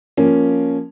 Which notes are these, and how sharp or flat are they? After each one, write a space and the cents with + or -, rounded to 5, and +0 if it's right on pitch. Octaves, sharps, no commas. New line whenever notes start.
F3 +0 A#3 +0 C#4 +0